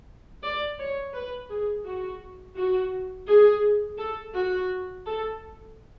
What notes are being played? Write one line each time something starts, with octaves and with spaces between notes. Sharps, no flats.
D5
C#5
B4
G#4
F#4
F#4
G#4
A4
F#4
A4